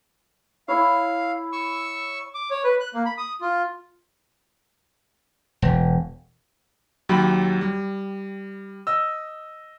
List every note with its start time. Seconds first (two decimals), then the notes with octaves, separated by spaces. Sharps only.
0.68 E4 C#5 F5
1.52 C#6 E6
2.34 D6
2.50 C#5
2.64 B4
2.80 F#6
2.94 A#3
3.06 B5
3.18 D#6
3.41 F4
5.62 E1
7.09 D#2 F#3 G4 B5
7.61 G3
8.87 D#5 E6